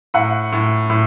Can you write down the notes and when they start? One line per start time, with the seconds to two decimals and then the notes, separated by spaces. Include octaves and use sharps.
0.14 A2 F#5
0.52 A2
0.90 A2